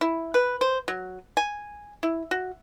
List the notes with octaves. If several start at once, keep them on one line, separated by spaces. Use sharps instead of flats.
E4
B4
C5
F#3
G#5
E4
F#4